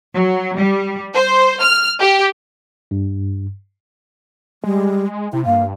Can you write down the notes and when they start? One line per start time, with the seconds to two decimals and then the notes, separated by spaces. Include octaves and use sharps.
0.14 F#3
0.57 G3
1.14 C5
1.62 F6
2.00 G4
2.91 G2
4.64 G3 G#3
5.33 C3 E4
5.46 G2 A#3 F5